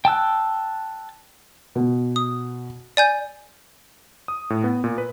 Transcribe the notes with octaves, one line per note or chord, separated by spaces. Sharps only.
G5 A5 E6 F#6
B2
D#6
D5 G#5 G6
D#6
A2
B3
A#2
B4